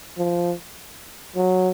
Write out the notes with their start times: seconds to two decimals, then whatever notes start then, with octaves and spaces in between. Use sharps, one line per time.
0.18 F3
1.36 F#3